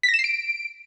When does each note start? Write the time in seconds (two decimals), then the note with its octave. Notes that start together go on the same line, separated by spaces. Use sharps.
0.03 B6
0.09 A#6
0.14 E7
0.19 C7
0.24 D7